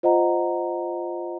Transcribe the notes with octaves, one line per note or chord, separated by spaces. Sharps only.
F4 C5 D#5 F#5 A#5